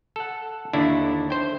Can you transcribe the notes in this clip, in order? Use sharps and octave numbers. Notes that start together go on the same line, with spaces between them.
A4 F#5
D#2 D3 D4 E4
C5 G5